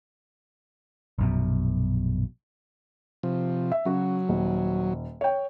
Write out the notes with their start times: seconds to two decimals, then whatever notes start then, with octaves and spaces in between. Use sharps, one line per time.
1.18 A#1 F#2 B2
3.23 C3 F3
3.72 E5
3.85 C#3 F#3 F#4
4.29 D#1
5.21 C#5 G5